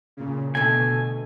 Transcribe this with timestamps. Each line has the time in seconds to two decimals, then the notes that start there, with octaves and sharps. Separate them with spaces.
0.17 A#2 C#3
0.55 B2 D3 A3 G#5